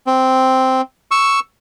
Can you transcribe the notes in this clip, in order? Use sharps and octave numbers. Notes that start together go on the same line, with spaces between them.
C4
C#6 E6